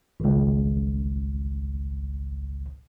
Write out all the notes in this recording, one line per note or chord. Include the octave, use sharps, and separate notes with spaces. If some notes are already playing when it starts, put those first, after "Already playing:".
G#1 C#2